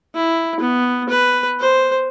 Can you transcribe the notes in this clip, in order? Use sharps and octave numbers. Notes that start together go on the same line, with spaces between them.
E4
B3
B4
C5